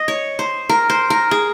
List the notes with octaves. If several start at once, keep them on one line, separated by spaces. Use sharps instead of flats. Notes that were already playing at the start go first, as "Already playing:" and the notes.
Already playing: D#5
C#5
C5
A#4
C5
A#4
G#4